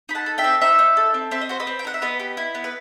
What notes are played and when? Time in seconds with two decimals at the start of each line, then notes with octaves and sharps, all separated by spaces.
0.09 D#4 B5
0.15 F#5 A5
0.26 A4
0.38 E5 G5
0.44 C4
0.61 D#4 C5 E5
0.79 D#4
0.97 A4
1.14 C4
1.31 C4 E5
1.41 D#5
1.49 F#4 C5
1.60 B4 D#5
1.67 C4
1.79 G5
1.85 D#4 F#5
1.94 E5
2.02 B3 B4 D#5
2.19 G4
2.37 E4
2.55 B3
2.64 B4